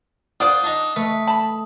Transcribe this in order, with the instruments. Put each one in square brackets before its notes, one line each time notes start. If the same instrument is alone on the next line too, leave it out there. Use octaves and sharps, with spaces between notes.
[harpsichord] F4 [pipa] C5 D5 F#5 [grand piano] D#6
[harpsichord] D4 D#4
[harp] A3 [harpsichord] B4
[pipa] A5 B5